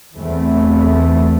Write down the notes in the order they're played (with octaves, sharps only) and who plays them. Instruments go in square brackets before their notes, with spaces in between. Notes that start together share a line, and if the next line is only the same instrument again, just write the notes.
[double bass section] E2 E3 A3 C4